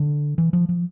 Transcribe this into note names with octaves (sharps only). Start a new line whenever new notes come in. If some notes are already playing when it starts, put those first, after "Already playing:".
Already playing: D3
E3
F3
F3